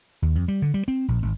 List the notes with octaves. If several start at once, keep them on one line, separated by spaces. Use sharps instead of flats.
D#2
F2
G3
D3
G3
C4
A#1
G#1